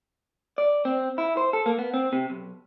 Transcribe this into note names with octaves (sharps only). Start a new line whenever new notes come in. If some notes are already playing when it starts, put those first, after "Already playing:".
D5
C4
E4
C5
A4
A#3
B3
C4
C3
B1